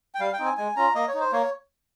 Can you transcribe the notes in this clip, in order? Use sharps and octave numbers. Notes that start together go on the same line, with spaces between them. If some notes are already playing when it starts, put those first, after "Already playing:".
G5
G3 F5
G5
C4 D#4
G#5
G#3 G#5
C#4 F4 A#5
A#3 D#5
C#5
D#4
C5
A#3 C#5